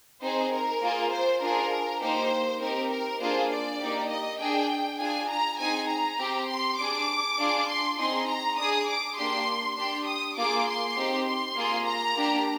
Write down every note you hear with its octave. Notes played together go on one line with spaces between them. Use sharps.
C4 D#4 G#4 C5
A#4
A#3 F4 G#4
C5
D4 F4 G#4 A#4
A#3 D#4 G4 C5
C4 D#4 G4 A#4
A#4
A#3 D4 F4 G#4 C5
D5
A#3 D#4 G4
D#5
D4 G#4 G5
D4 F4 G#4 G#5
A#5
C4 D#4 G#4 G#5
A#5
C4 G4
C6
D4 G#4 D6
D4 F4 G#4
C6
C4 D#4 G#4 C6
A#5
D4 G#4 D#6
D6
A#3 D4 G4 C6
D4 G4 C6
D#6
A#3 F4 G#4 D6
C6
C4 D#4 G4
C6
A#3 F4 G#4
A#5
A#3 D4 G4